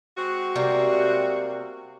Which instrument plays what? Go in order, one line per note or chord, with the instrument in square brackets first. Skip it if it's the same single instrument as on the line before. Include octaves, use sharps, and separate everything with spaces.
[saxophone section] G#3 C4 F#4
[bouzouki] C3 G3 A#3